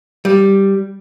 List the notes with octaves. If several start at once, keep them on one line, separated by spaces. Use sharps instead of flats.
G3